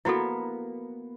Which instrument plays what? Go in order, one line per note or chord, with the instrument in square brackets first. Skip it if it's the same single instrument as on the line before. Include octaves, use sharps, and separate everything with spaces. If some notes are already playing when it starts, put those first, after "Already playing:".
[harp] A#3 B3 [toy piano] E4 F#4 A4